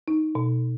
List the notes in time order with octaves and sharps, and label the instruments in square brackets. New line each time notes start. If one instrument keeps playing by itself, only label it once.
[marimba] D#4
B2